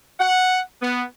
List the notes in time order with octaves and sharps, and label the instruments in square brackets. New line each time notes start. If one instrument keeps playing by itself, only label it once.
[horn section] F#5
B3